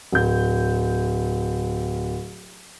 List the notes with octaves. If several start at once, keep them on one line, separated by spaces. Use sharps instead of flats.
D1 G6